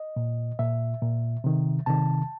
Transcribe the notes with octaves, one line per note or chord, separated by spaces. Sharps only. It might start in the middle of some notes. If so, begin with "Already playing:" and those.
Already playing: D#5
A#2
A#2 E5
A#2
C3 D#3
C3 D#3 A5